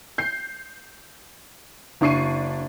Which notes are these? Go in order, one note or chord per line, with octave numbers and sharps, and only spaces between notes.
G6 C7
F#1 D4 C#6 C7 D#7